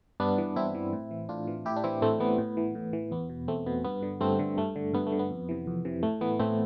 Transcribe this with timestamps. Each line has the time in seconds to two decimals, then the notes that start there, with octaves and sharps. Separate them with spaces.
0.20 G2 B3 D4
0.38 E3
0.56 G2 C4 E4
0.75 E3
0.93 A2
1.11 E3
1.29 A2 D4 F4
1.47 E3
1.65 A2 E4 G4
1.76 D4
1.84 E3 C4 E4
2.02 A2 A3 C4
2.20 E3 B3
2.38 A2
2.57 E3
2.75 A2
2.93 E3
3.11 E2 B3
3.29 B2
3.48 E2 A3 C4
3.66 B2 B3
3.85 G2 B3
4.03 D3
4.21 G2 A3 C4
4.39 D3
4.57 G2 A3
4.76 D3
4.94 G2 B3
5.07 A3
5.12 D3
5.19 B3
5.30 F2
5.49 C3 E3
5.67 F2
5.85 C3 E3
6.03 A2 A3
6.21 E3 B3
6.39 A2 A3 C4